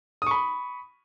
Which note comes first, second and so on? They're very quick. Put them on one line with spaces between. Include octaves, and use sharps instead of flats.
D#6 C#6 B5